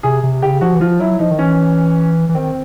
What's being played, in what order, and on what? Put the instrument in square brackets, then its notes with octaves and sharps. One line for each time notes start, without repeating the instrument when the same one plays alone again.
[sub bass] C3 [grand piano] G#4
[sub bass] C3
[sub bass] C#3 [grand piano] G4
[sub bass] F3 [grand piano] F#4
[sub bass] E3
[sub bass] F3 [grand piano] F4
[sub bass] F#3 [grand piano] E4
[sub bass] F3 [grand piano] D#4
[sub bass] D#3
[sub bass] E3 [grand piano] C#4
[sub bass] E3
[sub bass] D#3 [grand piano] C4